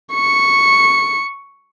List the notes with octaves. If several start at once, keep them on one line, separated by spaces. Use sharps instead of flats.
C#6 C#7